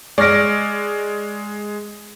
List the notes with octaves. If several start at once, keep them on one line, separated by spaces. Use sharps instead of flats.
G#3 D5 C#6 F6 A#6 D7